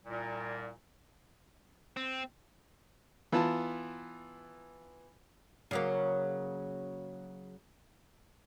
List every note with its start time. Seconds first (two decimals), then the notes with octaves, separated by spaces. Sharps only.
0.05 C2 A#2
1.97 C4
3.32 E3 B3 F4 A5
5.71 C#3 F#3 A#3